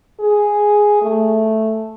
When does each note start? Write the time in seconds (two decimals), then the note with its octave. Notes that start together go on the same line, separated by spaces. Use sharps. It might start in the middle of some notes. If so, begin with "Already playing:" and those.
0.20 G#4
1.02 A3